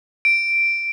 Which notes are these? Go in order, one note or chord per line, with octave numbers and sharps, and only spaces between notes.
D7